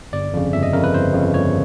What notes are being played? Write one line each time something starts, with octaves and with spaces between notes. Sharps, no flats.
G1 D5
F2 C#3
G1 E5
D#5
F2 C#3 A#4
B4
G1 C5
F2 C#3
G1 C#5